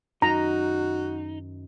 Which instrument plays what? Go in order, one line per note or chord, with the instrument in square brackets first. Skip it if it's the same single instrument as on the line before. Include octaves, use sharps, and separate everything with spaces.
[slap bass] F#2 D#3 [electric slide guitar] D#4 [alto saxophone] F#4 [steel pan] A#5